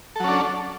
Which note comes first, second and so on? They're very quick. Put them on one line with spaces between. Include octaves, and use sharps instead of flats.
A4 F#3 C#4 D4